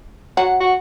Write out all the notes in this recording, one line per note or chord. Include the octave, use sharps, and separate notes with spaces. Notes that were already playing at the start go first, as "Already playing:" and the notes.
F#3 F#5
F#4